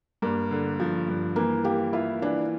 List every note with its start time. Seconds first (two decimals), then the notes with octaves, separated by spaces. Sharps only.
0.22 G2 A#3
0.51 D3
0.80 F3
1.08 G2
1.36 E3 A#3
1.65 A#3 G4
1.93 E4 F4
2.22 E3 D4